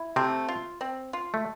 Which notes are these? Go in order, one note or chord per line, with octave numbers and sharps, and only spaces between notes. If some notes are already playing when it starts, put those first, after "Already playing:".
Already playing: E4
C3 A3 C4
F4
C4
F4
A3